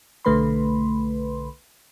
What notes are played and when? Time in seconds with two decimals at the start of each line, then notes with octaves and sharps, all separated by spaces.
0.25 B1 D3 A3 B4 B5 C6